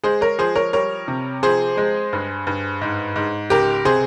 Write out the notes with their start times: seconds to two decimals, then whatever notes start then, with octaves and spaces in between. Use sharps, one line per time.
0.04 G#3 G#4 C5
0.21 A#4 C#5
0.38 F3 G#4 C5
0.56 A#4 C#5
0.73 G3 A#4 C#5
1.08 C3
1.43 F3 G#4 C5
1.77 G#3
2.13 G2
2.47 G2
2.81 G#2
3.16 G#2
3.50 C#2 G4 A#4
3.85 C3 G#4 C5